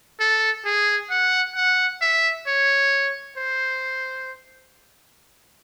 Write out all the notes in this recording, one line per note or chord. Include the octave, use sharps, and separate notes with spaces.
A4
G#4
F#5
F#5
E5
C#5
C5